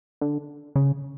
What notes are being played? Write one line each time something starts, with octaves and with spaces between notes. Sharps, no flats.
D3
C#3